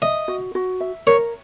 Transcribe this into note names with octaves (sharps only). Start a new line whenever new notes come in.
D#5 E5
F#4
F#4
E5
A#4 C#5